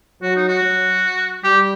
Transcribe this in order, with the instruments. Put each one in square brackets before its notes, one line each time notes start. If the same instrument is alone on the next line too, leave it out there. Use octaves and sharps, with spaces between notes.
[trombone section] F#3 [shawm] F#4
[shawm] D#4
F#4
[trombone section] F#3
[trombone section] G3 [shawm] G4